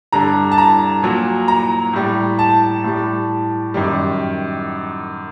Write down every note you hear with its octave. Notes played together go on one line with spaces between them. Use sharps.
G2 D3 G3 A#5
A5
A#5
A#2 F#3
A#5
A2 G3
A5
A2 G3
F#2 D#3 G3